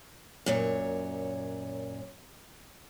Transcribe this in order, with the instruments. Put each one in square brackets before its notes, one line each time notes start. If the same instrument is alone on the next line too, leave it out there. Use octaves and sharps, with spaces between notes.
[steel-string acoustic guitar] F#2 A#2 C#5